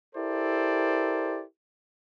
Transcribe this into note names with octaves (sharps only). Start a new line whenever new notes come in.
E4 G4 A4 A#4 C5 D5